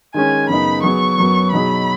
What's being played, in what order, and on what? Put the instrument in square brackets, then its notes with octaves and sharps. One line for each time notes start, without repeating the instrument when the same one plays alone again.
[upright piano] D#3 G#3 C#4 [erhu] G#5
[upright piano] F#2 C#3 B3 D#4 [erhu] B5
[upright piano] F#3 B3 G#4 [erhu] C#6
[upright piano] F#2 F#3 B3
[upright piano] B2 F#3 D#4 G#4 [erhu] B5